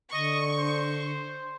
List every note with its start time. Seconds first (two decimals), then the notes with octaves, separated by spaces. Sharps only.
0.13 D3 D#5 C#6
0.58 C5